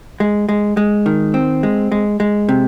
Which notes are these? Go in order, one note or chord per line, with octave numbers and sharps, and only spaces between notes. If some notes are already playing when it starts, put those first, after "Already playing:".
G#3
G#3
G#3
D#3
C4
G#3
G#3
G#3
C3